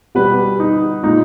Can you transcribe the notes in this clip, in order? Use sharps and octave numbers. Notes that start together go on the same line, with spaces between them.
B2 G3 B4
D#4
A#2 G#3 D#4